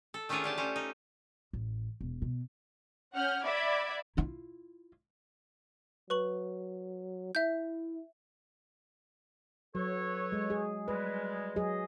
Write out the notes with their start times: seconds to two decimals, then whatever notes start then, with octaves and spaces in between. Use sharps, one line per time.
0.14 A4
0.29 D#3 A3 C#4 D4 F4 G#4
0.44 D3 G4 A5
0.58 C#4 C5 C#5
0.76 D#4
1.53 A1
2.01 E1
2.22 B2
3.15 C#4 F#5 F6 G6
3.44 D5 E5 F#5 B5 D6 G#6
4.17 E4 F4
6.10 F#3 B4 C#6 F#7
7.35 E4 E5 G6
9.75 F#3 A4 B4 C#5
10.32 G#3
10.50 G#4
10.88 G3 G#3 B4
11.56 F#3 G#4 D#5